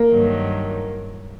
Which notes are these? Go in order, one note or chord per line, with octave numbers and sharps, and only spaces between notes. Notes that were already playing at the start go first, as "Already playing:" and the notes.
Already playing: A#3
G2 D#3 F#3